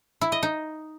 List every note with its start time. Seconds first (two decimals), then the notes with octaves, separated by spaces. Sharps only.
0.21 E4
0.32 D#5
0.43 D#4